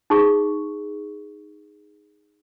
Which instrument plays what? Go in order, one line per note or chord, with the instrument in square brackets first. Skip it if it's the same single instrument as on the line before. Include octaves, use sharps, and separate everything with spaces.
[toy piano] D#4 G#4 C#6